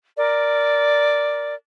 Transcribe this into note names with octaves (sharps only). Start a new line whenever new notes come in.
A#4 D5